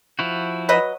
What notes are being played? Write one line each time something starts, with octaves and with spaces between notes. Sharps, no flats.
F3 E4 F#4
F#3 B4 D#5